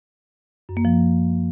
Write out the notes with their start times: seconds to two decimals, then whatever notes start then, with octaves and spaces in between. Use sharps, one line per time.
0.69 F#2
0.77 A#3
0.85 F3